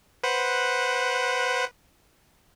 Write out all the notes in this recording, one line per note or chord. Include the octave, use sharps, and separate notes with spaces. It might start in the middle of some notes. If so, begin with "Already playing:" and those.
B4 C5 F#5